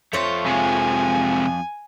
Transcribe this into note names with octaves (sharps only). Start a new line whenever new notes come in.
F2 A3 C4 F4 C#5
C3 G#3 G#5